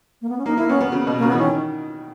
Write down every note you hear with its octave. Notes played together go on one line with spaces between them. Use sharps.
A#3
B3
C#4
A#3 D#4
A#3 E4
B3 C#4
B3
C#3
B2
C#3 A#3
E3 B3
D#3 C#4